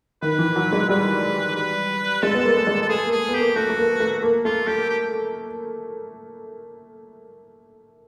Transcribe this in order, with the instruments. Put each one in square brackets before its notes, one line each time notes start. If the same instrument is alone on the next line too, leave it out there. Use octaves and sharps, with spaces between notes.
[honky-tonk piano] D#3 [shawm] B4
[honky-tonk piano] E3
F#3
G#3
[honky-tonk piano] G3 [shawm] B4
[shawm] B4
[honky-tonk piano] G#3 [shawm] A4
[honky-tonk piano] B3
A#3
A3
G#3
[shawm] A4
[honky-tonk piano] A3 [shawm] G#4
[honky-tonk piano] A#3
[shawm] G#4
[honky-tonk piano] B3
[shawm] G4
[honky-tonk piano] A#3
[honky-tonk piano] A3 [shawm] F#4
[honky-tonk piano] A3
A#3
A3
A#3
[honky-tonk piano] A3 [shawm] F4
[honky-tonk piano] A3 [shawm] G4
[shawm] G4